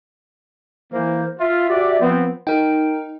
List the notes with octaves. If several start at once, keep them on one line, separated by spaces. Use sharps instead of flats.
E3 A#3 C5
F4 E5
F#4 G4 D5
F3 B3 C4
D#4 A#4 G5